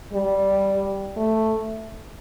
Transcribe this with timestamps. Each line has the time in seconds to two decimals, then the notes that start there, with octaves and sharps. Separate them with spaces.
0.13 G3
1.17 A3